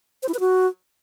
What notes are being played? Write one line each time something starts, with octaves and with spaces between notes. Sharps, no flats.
C5
E4
B4
F#4